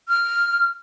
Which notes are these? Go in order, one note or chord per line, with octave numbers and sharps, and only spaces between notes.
F6